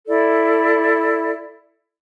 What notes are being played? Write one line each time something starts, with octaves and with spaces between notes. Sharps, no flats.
E4 A4 D5